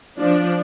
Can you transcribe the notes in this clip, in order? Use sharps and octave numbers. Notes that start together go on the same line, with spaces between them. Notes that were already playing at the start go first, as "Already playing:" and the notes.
F3 D4